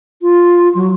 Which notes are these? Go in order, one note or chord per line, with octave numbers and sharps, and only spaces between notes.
F4
F#3